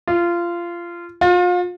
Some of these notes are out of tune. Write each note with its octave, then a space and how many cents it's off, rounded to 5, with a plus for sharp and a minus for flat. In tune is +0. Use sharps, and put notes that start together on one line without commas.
F4 -20
F4 +35